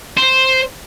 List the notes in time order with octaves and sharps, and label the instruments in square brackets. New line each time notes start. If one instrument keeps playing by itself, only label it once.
[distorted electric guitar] C5